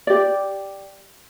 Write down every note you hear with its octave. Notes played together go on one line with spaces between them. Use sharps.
G4 D5